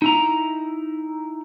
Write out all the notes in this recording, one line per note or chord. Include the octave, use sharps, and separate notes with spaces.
D#4 E4 A#5